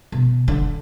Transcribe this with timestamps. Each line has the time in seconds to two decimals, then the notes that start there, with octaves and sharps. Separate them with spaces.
0.12 B2
0.48 D3